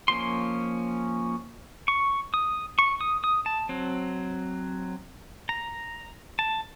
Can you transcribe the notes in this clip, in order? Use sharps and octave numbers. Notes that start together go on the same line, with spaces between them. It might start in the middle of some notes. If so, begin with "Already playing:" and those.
F3 A#3 C#4 C6
C#6
D#6
C#6
D#6
D#6
A5
F#3 C4
A#5
A5